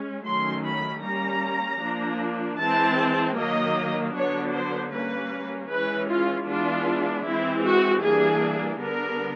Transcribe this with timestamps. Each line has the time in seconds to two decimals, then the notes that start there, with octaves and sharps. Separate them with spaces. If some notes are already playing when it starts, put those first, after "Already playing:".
Already playing: G#3 C#4
0.26 D#3 F#3 A3 C#4 C6
0.65 B5
1.04 G3 A#3 C#4 A#5
1.82 F3 A#3 D4
2.59 E3 G#3 C4 A5
3.37 D#3 F#3 A#3 D#5
4.15 D3 F#3 B3 D4 C#5
4.54 C5
4.92 G3 A#3 C#4 B4
5.71 E3 G#3 C#4 B4
6.10 F4
6.48 E3 G#3 B3 D4 F4
7.26 E3 G#3 C4 E4
7.64 F#4
8.03 E3 G3 A#3 D4 G#4
8.81 D3 G3 B3 D4 A#4